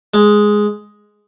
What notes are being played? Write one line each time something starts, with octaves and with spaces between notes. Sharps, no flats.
G#3